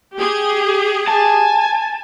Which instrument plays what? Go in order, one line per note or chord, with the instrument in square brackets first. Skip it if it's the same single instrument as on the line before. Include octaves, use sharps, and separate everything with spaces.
[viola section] G4 G#4
[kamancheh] G#5 [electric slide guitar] A5